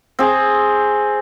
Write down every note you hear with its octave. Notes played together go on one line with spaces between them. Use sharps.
C4 G#4